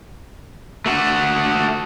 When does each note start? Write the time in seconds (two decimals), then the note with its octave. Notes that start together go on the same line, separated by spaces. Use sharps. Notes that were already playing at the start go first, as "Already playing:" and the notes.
0.86 A3 F#4